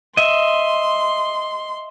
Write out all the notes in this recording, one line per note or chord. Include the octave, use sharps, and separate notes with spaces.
D#5 E5 C6